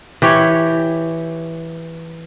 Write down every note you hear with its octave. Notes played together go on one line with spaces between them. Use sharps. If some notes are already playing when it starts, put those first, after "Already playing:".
E3 G4 C#5